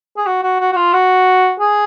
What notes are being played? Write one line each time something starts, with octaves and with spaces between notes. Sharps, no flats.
G#4
F#4
F#4
F#4
F#4
F4
F#4
G#4